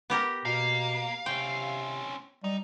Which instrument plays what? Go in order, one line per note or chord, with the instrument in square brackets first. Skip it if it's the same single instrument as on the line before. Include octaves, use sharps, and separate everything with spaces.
[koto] B3 G4 A#4
[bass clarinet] B2 [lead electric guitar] A#3 [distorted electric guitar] F5
[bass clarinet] C3 [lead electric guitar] C4 C#4 [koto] G5
[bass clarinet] G3 [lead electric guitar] D#4